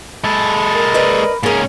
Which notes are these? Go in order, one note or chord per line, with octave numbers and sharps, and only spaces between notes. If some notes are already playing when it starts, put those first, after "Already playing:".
G#3 A4 B5
A#4
B4 D5 D#5
G#2 A#3 C#4 G#4 A#4